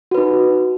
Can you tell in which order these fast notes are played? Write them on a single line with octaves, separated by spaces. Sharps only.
F#4 B4 D#4